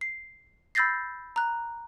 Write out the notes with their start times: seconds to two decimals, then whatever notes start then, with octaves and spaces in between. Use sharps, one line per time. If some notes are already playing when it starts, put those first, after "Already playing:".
0.01 C7
0.75 B5 E6 G6 A6 A#6 C7
1.36 A#5 F#6